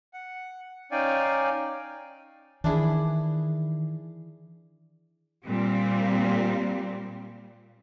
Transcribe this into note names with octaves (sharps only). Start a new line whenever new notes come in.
F#5
C#4 D#4 D5 F5 G5 G#5
D#3 E3 D4 E4 G#4
A#2 G3 C4